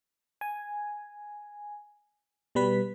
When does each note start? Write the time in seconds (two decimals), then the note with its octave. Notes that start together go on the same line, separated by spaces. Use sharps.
0.41 G#5
2.55 B2 G3 B4 B6